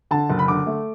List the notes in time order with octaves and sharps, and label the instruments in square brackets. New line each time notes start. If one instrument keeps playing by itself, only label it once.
[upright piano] D3 A5
F#1
B5
D3 D6
A3